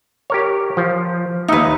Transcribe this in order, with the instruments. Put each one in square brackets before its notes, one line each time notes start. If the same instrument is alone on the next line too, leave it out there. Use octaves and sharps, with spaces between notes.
[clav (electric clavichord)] G4 A#4 C#5
F3
[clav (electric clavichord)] D#2 D#5 E5 [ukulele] D#4 B4